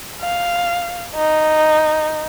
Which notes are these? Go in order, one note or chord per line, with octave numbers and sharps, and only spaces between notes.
F5
D#4